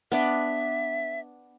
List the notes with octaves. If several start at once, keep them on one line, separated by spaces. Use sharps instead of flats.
B3 D4 D5 E5